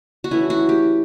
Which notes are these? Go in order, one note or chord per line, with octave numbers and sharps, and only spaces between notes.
F#4
E3 A3 C#4 E4
F#4
G4